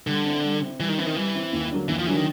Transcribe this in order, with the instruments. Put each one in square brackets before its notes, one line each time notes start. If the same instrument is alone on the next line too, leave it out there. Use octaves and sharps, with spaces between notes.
[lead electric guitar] D3 [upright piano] G3
[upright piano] C4 E4
G3
C4 E4
[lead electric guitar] E3 [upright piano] G3
[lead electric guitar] D#3
[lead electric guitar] E3 [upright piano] C4 E4
[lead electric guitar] D#3
[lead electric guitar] E3 [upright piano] G3
[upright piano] C4 E4
D#2
D3 F#3 A#3 D4
[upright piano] D#2 [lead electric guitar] E3
[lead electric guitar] F3
[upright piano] D3 F#3 A#3 D4 [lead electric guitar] E3
[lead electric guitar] D#3